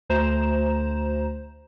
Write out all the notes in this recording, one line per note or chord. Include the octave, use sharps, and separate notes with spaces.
D2 C5 A#5 E7